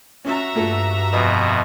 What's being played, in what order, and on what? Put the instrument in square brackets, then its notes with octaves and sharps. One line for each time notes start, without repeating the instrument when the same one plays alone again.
[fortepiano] C#4 [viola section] F#4 E5 A#5
[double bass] G2 [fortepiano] A#2 A3 A4
[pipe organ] F2 B2 [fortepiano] B4 D#5 D#6